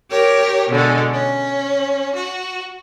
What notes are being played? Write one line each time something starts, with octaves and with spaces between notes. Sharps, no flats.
G4 A#4 C#5
B2 D3 G#3
C#4
F#4